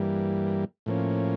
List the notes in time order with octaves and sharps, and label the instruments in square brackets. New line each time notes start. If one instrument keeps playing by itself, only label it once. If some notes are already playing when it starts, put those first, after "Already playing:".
Already playing: [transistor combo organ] G2 E3 G3 A#3
A2 F3 A#3 C#4